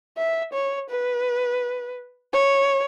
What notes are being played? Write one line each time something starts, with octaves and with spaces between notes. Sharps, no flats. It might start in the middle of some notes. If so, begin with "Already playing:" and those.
E5
C#5
B4
C#5